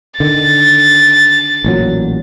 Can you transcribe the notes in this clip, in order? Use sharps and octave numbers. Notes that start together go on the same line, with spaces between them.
D3 D#3 A6
A1 A#2 F#3